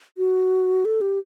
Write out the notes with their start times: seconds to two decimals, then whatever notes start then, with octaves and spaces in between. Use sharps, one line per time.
0.18 F#4
0.85 A4
1.01 G4